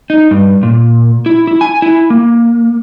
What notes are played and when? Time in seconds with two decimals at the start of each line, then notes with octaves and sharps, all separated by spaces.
0.10 D#4
0.31 G2
0.63 A#2
1.26 E4
1.47 E4
1.61 G#5
1.82 E4
2.10 A#3